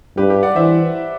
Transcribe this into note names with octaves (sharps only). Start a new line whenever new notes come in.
G2 G4 B4
G4
D5 F#5
E3 C5 E5